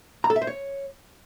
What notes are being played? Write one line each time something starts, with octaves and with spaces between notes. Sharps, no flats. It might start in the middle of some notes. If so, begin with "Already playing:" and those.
A#5
A4
E5
C5
C#5